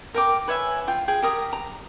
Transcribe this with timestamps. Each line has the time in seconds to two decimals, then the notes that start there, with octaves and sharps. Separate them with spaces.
0.14 A#4 G5 D6
0.48 B4 C#5 E5 G#5
0.88 F4 G5
1.08 G#4 G5
1.23 G4 A#4 D#6
1.53 A#5